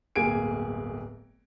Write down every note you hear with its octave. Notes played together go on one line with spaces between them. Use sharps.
D1 G1 A#3 G#4 G#6 D7